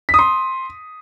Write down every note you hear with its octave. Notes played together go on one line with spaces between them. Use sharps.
B6
D#6
C6